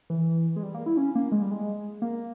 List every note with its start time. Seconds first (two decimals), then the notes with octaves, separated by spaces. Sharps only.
0.10 E3
0.56 G#3
0.63 G3
0.74 A#3
0.86 E4
0.97 C#4
1.15 A#3
1.32 G#3
1.42 G3
1.51 G#3
2.02 A#3